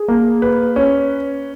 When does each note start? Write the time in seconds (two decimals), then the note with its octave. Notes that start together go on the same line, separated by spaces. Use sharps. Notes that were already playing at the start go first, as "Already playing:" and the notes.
Already playing: G#4
0.08 A#3
0.42 B4
0.76 C#4